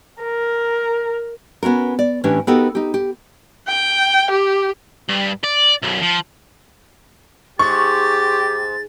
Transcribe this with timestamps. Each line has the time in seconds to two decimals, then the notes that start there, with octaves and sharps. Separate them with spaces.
0.23 A#4
1.63 B3 C#4 F#4 A#4
1.99 D5
2.24 A2 E3 C#4 D4 E4 G4
2.47 B3 D#4 F#4 G4 A4 A#4
2.75 D#4 G4
2.94 G4
3.68 G5
4.31 G4
5.09 G2
5.44 D5
5.82 B1 F#2
6.01 F3
7.59 G#2 G4 C#6 A6